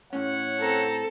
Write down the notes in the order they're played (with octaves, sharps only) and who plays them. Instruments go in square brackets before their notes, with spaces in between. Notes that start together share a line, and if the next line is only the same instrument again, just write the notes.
[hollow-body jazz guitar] A2 C#4 [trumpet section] C#5 F#5
[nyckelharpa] C4 A#5 [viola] A4